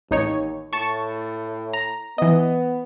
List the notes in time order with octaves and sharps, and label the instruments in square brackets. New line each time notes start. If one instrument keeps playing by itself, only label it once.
[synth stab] A1 D#4 C#5 [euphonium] D#2
[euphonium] A2 [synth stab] A5 C#6
[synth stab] A#5
[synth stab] E3 D#5 [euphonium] B3